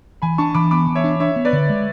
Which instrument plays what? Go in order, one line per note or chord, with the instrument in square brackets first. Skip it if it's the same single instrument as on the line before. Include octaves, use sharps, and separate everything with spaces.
[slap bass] E3 [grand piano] G#5 B5
[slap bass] D4 [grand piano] A5 C#6
[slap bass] E3 [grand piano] B5 D6
[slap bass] B3 [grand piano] B5 D6
[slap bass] E3
[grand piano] C#5 E5
[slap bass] D4
[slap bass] D4 [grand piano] C#5 E5
[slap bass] B3
[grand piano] B4 D5
[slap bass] D3
G#3